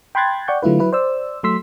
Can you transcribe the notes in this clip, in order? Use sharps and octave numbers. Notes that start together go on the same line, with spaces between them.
G5 B5 C6 F#6 G#6 A6
D5 F#5 G5 C#6 G6
D3 F#3 A3 E4 F4 B4
F#3 E4 B4
C5 D5 E6
F#3 A3 C6 E6 B6